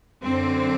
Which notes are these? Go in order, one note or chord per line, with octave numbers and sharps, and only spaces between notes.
F#2 D3 C4